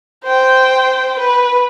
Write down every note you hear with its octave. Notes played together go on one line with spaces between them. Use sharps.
C5 G5
B4